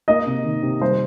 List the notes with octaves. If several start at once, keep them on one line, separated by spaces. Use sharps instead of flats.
A#3 D#5
C3
D#3
C3
G3 C5